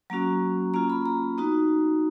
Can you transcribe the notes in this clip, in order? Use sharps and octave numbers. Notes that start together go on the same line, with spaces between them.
F#3 A#3 C#4 F#4 A#5
A#3 C#4 F4 A#5
B5
A#5
B3 D#4 F#4